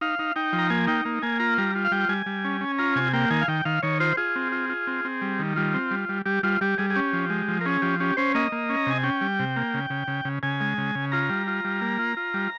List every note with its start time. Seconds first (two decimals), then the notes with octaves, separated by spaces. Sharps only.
0.01 D#4 F5
0.19 D#4
0.36 D#4 G5
0.53 F3
0.58 A#5
0.70 A#3 G#5
0.87 D#4 G5
1.05 A#3
1.22 A#3 G#5
1.40 F4 A#5
1.58 G3 A#5
1.75 F4
1.85 F5
1.92 G3 G5
2.09 G3 G#5
2.26 G3
2.45 C#4
2.61 C#4
2.78 F4 A#5
2.96 C3 G#5
3.13 A#3 G5
3.30 D#3 G#5
3.41 F5
3.48 D#3 G5
3.65 D#3 F5
3.83 D#3 C#5
4.00 F4 C5
4.17 F4 G#4
4.36 C4
4.52 F4
4.69 F4
4.87 C4
5.05 C4
5.22 G3
5.39 D#3
5.56 G3 F4
5.74 C4
5.91 G3
6.09 G3
6.26 G3 G4
6.43 G3 F4
6.61 G3 G4
6.78 G3 G#4
6.90 G#4
6.95 C#4 G4
7.13 F3
7.30 G#3
7.48 F3
7.61 A#4
7.65 C#4 G#4
7.82 F3 G4
8.00 C#4 G4
8.17 C#4 C5
8.35 A#3 D#5
8.52 A#3
8.69 C#4
8.77 A#5
8.87 C3 G#5
9.04 C#4 G5
9.21 G3
9.39 C3
9.56 A#3
9.74 C#3
9.90 C#3
10.08 C#3
10.25 C#3
10.43 C#3 G#5
10.61 G#3
10.78 C#3
10.95 C#3
11.12 F4 A#5
11.29 G3
11.47 F4
11.64 G3
11.81 A#3
11.99 F4
12.17 F4
12.34 G3